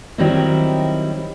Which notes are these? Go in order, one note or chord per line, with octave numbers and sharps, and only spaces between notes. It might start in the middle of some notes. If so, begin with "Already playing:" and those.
D#3 F#3 G3 C4 D#4 E4